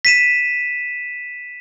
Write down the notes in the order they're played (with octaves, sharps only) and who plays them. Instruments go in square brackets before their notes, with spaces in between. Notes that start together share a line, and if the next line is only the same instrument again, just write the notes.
[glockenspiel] B6 D#7 E7